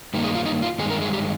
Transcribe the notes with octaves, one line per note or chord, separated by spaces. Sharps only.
G2 D#3 A#3 D#4
G#4
F4
D#4
F4
G2 D#3 G#3 G#4
A#4
G#4
G4